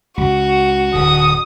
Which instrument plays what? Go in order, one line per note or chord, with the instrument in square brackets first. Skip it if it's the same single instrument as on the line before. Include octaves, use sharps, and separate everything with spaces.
[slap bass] C#2 [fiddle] F#4
[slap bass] D1 D3 [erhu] D#6